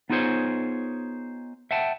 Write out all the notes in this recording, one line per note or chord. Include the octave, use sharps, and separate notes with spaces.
B3 D#4 F4 G#4 C5 C#5
E5 F#5 G5 A5